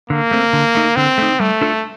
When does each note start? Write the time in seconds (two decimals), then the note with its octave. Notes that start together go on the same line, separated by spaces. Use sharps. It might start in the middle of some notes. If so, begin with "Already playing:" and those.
0.10 D3 A#3
0.31 A3 C4
0.53 D3
0.75 A3 D#4
0.96 D3 C4
1.18 A3 D#4
1.40 G3 A3
1.61 D4 F4 A4